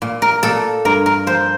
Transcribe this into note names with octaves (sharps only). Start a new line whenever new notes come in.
A#2
A#4
A#2 A4
G2 A#4
A#4
F3 C5